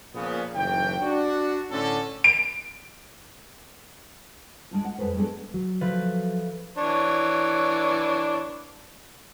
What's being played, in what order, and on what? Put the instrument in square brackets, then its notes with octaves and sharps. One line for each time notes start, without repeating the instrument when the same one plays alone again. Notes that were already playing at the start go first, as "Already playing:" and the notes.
[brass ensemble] A#2 C#3 F3 B3
F#1 B1 A2 E3 G5
D4 F#4
A2 D3 C#4 A4
[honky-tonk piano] D7
[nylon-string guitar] G#3 D4 F4
F#5
F2 F3 G#3 A3 B4 C5
F#3 G#3 B3 D4 A4
[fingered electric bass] F#3
[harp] F3 A3 B4
[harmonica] E3 D4 C#5